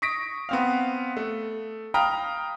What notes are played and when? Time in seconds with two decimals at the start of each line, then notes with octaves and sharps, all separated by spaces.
0.02 C#6 D#6 A#6 B6 D7
0.49 B3 C4 F5
1.17 A3
1.94 F5 G5 A#5 B5 D#6 F6